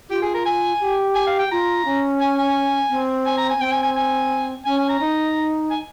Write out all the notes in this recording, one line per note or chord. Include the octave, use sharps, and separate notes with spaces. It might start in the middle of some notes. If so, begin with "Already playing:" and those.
F4 G4
G#4
A#4
G#5
G4
G#5
F5
G5
F4 A#5
C#4
G#5
G#5
C4
G#5
A#5
G#5
C4 G5
G#5
G#5
G#5
C#4 G#5
G#5
A#5
D#4
G#5